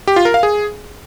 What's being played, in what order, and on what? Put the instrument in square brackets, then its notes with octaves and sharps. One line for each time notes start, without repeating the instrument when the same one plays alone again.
[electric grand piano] G4
F4
A#4
F5
G#4